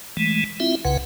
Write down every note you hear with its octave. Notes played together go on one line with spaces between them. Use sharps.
E3 G#3 A3
C4 E4 F4 E5
C2 C#3 B4 F#5